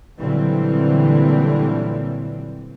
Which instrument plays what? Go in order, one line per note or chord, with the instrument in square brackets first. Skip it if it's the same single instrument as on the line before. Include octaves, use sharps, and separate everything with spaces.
[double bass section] A#2 D3 E3 F#3 G3 C4